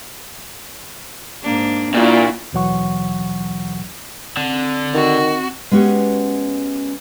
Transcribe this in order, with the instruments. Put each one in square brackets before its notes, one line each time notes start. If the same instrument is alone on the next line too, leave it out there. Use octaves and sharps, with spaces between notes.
[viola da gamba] G#2 A#3 D4
[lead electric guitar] A#2 [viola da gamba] D4 E4 F#4
[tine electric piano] D#2 B2 E3 F#3 F#5 C#6
[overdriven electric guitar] D3 [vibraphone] C4
[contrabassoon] D#3 [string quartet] F#4
[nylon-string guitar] G#3 B3 C#4 F#4 G4